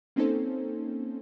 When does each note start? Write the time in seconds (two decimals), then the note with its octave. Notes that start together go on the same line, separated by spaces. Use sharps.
0.16 A#3 C4 C#4 D#4 A4 C5